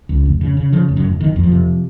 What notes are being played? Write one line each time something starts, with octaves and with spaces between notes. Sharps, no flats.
C#2
F1
C#3
C#3
C#3 F3
F1
F#2 F#3
F1
F#1 D#3
F2
F3
C3